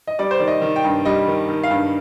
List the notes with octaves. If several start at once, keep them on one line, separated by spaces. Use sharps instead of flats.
D#5
G3 D5
C5
D#3 D5
D#5
D#3
G5
G2
G3 D#5
D#3
D#3
F5
G2